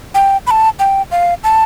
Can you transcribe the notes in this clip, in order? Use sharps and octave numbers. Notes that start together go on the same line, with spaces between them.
G5
B5
A5
G5
F5
A5